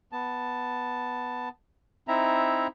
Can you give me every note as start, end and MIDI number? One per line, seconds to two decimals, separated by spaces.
0.12 1.49 59
0.12 1.49 81
2.08 2.67 60
2.08 2.67 63
2.08 2.67 64
2.08 2.67 76
2.08 2.67 82